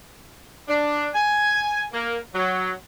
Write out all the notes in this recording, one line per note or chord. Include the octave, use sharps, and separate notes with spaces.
D4
G#5
A#3
F#3